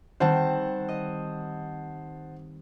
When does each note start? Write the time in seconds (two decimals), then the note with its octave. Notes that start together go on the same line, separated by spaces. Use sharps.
0.20 D#3 G3 C4 C5 F#5 A5
0.88 D#5